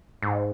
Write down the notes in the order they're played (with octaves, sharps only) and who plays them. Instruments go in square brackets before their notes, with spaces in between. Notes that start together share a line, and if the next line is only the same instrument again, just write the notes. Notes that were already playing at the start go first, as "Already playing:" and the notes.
[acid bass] G#2